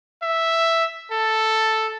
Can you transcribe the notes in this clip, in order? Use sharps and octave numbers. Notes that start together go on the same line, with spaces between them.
E5
A4